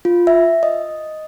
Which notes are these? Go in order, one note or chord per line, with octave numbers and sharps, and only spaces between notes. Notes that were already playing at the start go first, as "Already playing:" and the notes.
F4
E5
D#5